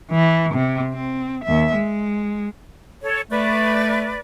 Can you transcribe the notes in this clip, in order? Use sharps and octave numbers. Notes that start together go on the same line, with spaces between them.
E3
C3
C4
D#2 E5
G#3
A4 C#5
A3 B4 D5